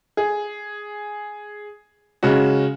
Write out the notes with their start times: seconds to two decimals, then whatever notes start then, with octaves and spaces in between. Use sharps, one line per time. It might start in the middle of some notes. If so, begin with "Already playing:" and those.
0.17 G#4
2.23 C#3 G#3 C#4 F#4